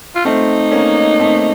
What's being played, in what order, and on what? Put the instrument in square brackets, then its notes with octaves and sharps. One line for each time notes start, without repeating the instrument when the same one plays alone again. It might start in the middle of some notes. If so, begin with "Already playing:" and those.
[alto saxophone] F4
[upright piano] A3 C4 [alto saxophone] D#4
[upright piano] A#3 C#4
A3 C4